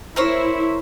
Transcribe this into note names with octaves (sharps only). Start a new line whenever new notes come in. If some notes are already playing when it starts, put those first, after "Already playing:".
E4 A#4 C5 C#5